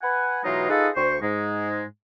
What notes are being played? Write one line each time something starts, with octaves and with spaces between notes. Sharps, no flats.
B4 F#5 G#5
B2 E3 F#3 G#3 D#4 F4
D#4 F4 G#4 A4 B4 D#5
D2 C5 C#6
G#2 G#3